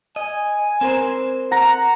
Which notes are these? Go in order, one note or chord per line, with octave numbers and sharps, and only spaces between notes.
D#5 G#5
C4 A#4 C5
F#5 A#5